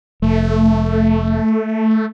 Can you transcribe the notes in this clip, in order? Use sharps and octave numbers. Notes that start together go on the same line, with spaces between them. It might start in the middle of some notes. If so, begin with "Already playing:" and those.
F1 A3